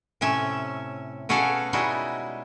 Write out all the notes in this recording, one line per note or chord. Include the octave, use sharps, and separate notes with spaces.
A2 C3 C#4 E5
B2 C#4 F#4 G#4 A4 F5
G3 G#3 D#4 E4 F#4